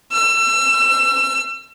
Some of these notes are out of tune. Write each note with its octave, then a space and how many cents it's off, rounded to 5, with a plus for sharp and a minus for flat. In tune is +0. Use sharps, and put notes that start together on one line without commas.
E6 +35